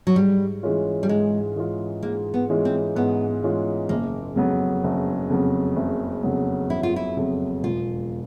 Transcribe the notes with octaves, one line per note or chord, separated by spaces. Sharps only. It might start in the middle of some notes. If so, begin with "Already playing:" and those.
F#3
G#2 G3
E3 G#3 C#4 F4
G3
G#2 G#3
E3 G#3 C#4 F4
G#2 A#3
B3
E3 G#3 C#4 F4
C4
G#2 B3
E3 G#3 C#4 F4
F#1 A#3
F2 C#3 F#3 B3
F#1
F2 C#3 F#3 B3
F#1
F2 C#3 F#3 B3
F#1 E4
F4
E4
F2 C#3 F#3 B3
E1 F4